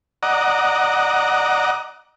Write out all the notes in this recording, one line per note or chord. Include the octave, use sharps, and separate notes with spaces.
D5 D#5 F#5 A#5